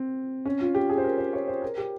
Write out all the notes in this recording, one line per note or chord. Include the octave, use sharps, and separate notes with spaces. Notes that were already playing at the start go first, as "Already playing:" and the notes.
Already playing: C4
C#4
F4
G4
G#4
C5
A#4
C5
C#5
C5
A#4
G4